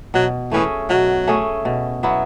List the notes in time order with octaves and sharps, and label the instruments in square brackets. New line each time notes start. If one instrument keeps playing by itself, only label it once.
[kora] B2 [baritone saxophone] F#3
[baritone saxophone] E3 [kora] A3 C#4 G#4
[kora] B2 [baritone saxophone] F#3
[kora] A3 C#4 G#4
B2
F#3 B3 E4